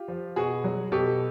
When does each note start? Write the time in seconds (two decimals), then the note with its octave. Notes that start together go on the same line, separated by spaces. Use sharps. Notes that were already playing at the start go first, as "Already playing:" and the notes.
Already playing: F4 G4
0.08 F3
0.36 B2 F#4 G#4
0.64 F#3
0.92 B2 G4 A4